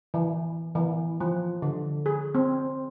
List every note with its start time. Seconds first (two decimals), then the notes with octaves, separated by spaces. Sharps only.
0.14 E3
0.75 E3
1.20 F3
1.62 D3
2.06 G#4
2.35 C4